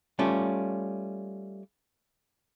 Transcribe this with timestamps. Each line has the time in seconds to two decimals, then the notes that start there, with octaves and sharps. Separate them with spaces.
0.19 G3 A3 C#4 F4